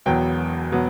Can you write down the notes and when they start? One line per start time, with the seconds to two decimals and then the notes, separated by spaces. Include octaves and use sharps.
0.06 E1 E2 B2 F#3 B3 G5
0.72 B2 F#3 B3